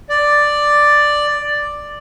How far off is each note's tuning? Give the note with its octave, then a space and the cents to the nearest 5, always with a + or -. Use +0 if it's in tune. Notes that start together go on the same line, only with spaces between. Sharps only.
D5 +5